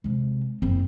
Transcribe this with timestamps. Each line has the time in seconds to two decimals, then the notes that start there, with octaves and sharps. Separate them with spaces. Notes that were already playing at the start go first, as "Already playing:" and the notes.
0.04 C3 G#3
0.62 F#1 C4